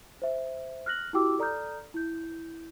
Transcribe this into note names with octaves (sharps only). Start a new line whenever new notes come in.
C5 E5
F6 F#6 A#6 F#7
E4 F#4 G4 G5 D6 E6
A4 D5 A#5 D#6 F6 G6
E4 G6